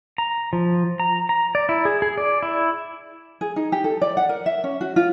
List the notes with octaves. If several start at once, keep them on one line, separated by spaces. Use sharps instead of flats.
A#5
F3
A#5
A#5
D5
E4
G#4
G#4
D5
E4
G#4
D#4
G4
A4
D5
F#5
A#4
E5
C#4
F#4
F4